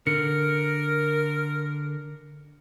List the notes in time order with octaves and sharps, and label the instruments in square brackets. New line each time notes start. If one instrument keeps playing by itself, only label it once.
[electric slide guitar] D3 [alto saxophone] A#4 [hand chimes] C#7